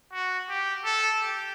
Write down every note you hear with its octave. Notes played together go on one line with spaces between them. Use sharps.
F#4
G4
A4
G4